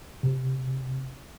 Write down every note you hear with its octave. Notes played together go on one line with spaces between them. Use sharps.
C3